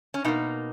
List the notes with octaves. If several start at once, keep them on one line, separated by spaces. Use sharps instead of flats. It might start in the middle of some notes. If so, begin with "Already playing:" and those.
C#4
B2 A#3 D#4